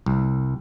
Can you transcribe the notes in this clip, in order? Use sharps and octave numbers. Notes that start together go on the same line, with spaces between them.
C2